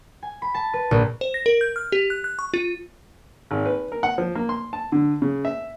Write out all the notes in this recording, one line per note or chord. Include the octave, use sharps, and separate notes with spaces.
G#5
B5
A5
B4
A#1
C5
A#6
A#4
G6
F6
G4
F#6
F#6
C#6
F4
G#1
B4
A#4
F#5
F3
A#3
C6
A5
D3
C#3
E5